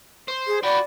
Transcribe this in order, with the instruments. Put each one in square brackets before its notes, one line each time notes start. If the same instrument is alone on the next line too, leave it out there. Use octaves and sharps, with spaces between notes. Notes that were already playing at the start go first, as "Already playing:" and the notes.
[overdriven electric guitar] C5
[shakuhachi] G#4
[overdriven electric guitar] F#4 G5 [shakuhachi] D5 [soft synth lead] B5